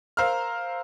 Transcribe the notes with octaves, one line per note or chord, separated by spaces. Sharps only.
A#4 C5 F5 A#5 E6 F6